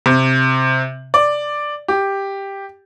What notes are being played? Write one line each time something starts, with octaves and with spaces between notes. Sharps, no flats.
C3
D5
G4